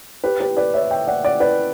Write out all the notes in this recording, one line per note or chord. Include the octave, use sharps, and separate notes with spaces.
G4 B4
G4 B4
B4 D5
C#5 E5
E5 G5
D5 F#5
D5 F#5
B4 D5